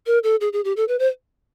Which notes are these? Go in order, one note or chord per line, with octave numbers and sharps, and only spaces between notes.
A#4
A4
G#4
G#4
G4
A4
B4
C5